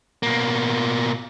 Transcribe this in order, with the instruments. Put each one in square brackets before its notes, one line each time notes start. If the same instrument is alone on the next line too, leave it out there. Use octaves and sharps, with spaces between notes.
[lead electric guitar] B2 A#3